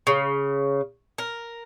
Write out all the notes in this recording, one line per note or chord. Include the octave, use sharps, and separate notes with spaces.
C#3
A#4